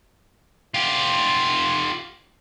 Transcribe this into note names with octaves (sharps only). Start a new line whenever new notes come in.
F4 G4